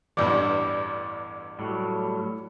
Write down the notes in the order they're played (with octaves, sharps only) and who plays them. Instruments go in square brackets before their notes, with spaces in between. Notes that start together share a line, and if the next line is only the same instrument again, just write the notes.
[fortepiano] A1 E2 G2 [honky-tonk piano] D5 [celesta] D6
[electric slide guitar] A2 F#3 G3